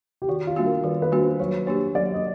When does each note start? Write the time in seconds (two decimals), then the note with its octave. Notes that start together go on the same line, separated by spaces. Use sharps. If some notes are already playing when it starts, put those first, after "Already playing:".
0.22 G4
0.28 D#3 F#4
0.47 F4
0.56 G3 A#3 D4 F#4
0.66 A#4
0.84 D#3 B4
1.02 B4
1.12 G3 A#3 D4 F#4
1.21 C5
1.40 F#3 C#5
1.67 A#3 D4 G4 C#5
1.95 F#3 D5
2.14 D#5